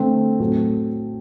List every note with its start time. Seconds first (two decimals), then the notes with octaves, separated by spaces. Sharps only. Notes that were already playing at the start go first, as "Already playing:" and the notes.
Already playing: D3 A3 C4
0.40 A2 F#3 C4 F#4 A4